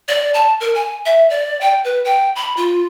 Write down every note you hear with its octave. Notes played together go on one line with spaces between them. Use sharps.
D5
A5
A#4
G#5
E5
D5
G5
B4
G5
B5
F4